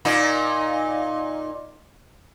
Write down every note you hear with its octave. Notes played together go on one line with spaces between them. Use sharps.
A#2 D#4